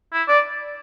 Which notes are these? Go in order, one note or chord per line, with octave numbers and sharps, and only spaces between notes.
E4
D5